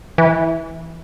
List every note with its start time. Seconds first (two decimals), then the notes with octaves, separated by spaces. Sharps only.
0.18 E3